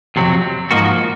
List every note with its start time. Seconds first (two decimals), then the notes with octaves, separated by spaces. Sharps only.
0.16 F2 C3 F#3 C4
0.71 G#2 F3 A#3 D#4 F#4